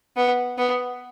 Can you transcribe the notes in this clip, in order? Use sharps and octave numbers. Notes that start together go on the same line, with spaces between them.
B3
B3